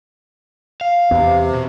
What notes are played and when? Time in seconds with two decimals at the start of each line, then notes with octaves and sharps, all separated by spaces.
0.81 F5
1.11 E2 C3 B3
1.55 B2